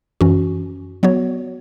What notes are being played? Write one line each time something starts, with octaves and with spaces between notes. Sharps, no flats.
F#2 E3 C#4 F#4
F#3 B3 F#4 C#5